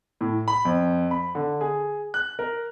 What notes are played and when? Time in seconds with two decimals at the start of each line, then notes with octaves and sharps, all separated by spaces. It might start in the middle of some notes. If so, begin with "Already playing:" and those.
0.21 A2
0.48 B5
0.65 F2
1.11 B5
1.35 D3
1.61 G#4
2.14 F#6
2.39 A#4